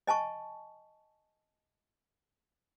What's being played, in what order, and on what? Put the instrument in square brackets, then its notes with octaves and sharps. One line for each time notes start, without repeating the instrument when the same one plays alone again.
[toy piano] D#5 G#5 A5 C#6